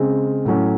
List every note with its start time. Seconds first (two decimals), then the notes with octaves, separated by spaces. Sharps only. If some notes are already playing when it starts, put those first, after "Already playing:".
Already playing: C#3 G#3 C4
0.45 A2 F#3 C#4